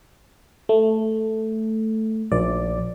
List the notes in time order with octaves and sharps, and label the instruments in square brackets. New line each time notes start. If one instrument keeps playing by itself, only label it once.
[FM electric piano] A3
[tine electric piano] A#1 [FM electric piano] D5